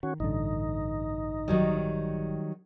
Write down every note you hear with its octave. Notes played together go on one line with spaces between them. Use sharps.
D#3 C#4 F#4
A1 G2 D3 D#4
D#3 F#3 G3